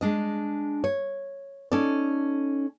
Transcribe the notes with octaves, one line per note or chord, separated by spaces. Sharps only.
G#3 D4 D#5
C#5
C#4 D#4 A4 D5